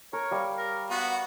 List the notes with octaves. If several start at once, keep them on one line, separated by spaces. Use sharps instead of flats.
A#4 C#5
G3 F5
A#4
B3 F#4